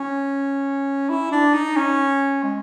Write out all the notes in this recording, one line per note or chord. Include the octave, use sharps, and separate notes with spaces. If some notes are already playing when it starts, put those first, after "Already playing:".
Already playing: C#4
E4
D4
D#4
C#4
G#3